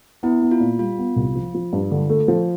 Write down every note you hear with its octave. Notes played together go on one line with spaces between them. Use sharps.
B3 E4
B3
F4
A#2
G3 F4
B3
C2
F3
F3
G2
D3
A3
F3